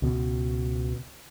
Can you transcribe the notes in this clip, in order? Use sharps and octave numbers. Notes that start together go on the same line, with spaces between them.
C#2 B2